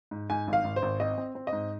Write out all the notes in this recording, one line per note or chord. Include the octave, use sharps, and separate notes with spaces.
G#2
G#2 G#5
G#1
F5
G#1
C5
G#1
C4 D#5
C4
C4
D#5
G#2